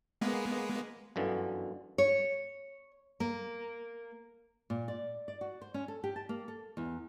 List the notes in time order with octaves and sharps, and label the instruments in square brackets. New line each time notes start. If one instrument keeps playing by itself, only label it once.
[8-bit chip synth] G#3 A#3 B3
[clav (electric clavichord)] G1 F#2 D3 E3
[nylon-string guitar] C#5
A#3
A#2
D5
D5
F#4
C5
C#4
A4
G4
A5
A#3
A4
E2